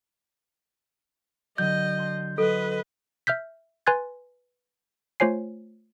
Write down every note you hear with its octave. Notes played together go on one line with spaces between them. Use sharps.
D3 F#3 D#5 G6
A5 C6
F#3 A4 B4 D#5
E5 F6 G6 B6
B4 G#5 C6 F#6 G#6 A6
A3 F4 C5 C#5 G#5 C7